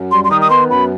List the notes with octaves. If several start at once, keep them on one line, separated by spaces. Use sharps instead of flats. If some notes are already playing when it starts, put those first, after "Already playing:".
Already playing: F#2
G3 C6
C6
D#3 D#6
D#6
B3 C6
F#2 B5